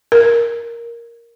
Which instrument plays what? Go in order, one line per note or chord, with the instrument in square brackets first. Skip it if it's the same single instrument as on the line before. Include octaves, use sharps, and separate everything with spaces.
[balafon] A#4